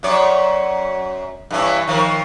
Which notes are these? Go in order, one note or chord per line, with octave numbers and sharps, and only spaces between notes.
F#2 C#5 D5
G2 E3 C#4
D#3 F3 A#4